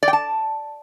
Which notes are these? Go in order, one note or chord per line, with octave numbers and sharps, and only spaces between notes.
D5
G5
A5